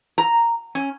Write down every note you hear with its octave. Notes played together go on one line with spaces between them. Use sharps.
A#5
C#4